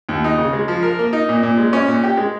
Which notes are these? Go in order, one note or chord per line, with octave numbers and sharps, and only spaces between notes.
D#2
D#4
C#3
G#3
F3
A#4
A#3
D#4
A#2
A#2
G#3
C#4
A#2
G4
G#3